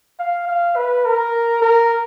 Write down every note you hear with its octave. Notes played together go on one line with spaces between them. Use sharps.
F5
F5
B4
A#4
A#4